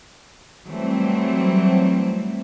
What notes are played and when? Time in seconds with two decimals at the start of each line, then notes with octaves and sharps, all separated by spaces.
0.67 E3 F#3 G3 A3 C4